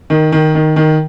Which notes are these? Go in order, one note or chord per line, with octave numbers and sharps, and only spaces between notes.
D#3
D#3
D#3
D#3